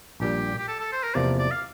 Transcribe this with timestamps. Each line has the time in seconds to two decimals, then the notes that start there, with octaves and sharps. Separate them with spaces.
0.20 A#1 A#2 G3 G4
0.58 G4
0.68 A4
0.80 A4
0.92 C5
1.03 A#4
1.14 E2 C3 F3 A#3 D5
1.39 D5
1.51 F5